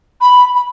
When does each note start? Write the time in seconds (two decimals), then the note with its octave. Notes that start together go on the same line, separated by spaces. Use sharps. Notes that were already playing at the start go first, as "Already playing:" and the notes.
0.21 B5
0.55 B5